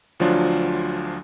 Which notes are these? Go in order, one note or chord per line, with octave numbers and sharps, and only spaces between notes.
D2 F3 F#3 D4 F4